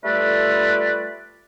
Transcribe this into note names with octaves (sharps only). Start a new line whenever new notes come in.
G3 A3 F4 A4 B4 D5